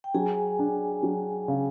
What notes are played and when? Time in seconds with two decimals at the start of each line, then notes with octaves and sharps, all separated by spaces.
0.04 G5
0.14 F#3 G#4 G#5
0.59 D4
1.03 F#3
1.48 C#3